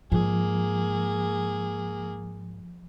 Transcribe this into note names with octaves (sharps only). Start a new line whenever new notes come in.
G#2 F3 A#3 G#4